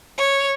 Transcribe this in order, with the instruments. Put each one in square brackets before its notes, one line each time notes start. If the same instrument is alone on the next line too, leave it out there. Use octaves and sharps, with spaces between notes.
[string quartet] C#5